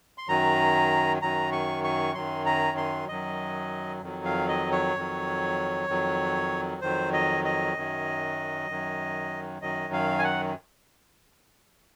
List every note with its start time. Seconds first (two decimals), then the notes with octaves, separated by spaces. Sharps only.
0.18 C6
0.28 F#2 D#3 F#3 A#5
1.22 F#2 D#3 F#3 A#5
1.52 C#6
1.84 C#6
2.14 F#2 D#3 F#3 C6
2.46 A#5
2.77 C6
3.08 F#2 D#3 F#3 D#5
4.01 F2 D#3 F#3
4.25 F5
4.48 D#5
4.72 C#5
4.95 F2 D#3 F#3
5.88 F2 D#3 F#3
6.81 F2 D#3 F#3 C5
7.13 D#5
7.44 D#5
7.75 F#2 D#3 F#3
8.69 F#2 D#3 F#3
9.62 F#2 D#3 F#3 D#5
9.93 F5
10.19 G#5
10.24 F#5